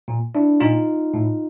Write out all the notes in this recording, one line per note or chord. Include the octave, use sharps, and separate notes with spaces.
A#2
D4 E4
A#2 D#4 F4
A2